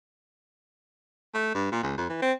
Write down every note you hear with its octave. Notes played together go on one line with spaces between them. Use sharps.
A3
G2
A#2
C#2
F2
E3
C4